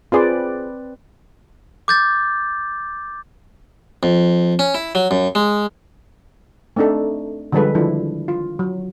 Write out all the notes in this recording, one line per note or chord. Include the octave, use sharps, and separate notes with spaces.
C4 F4 G#4 B4 C5 D5
D6 G6 A6
F2
C#4
E4
F#3
F#2
G#3
A3 C4 D4 D#4 A4
D3 F3 G3 G#3 A4 B4
D#3 F3 D4 E4
F4
F#3